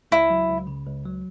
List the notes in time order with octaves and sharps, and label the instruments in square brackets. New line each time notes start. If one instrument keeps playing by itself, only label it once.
[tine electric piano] C#2 [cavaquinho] E4
[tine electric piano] F#3
C#2
C#3
C#2
F#3